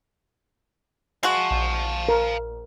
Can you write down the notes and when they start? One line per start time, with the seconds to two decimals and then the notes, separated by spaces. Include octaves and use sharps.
1.23 G#3 F#4 F5 A5
1.51 A#1
2.09 A#4